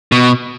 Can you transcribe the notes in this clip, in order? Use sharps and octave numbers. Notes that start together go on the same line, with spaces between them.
B2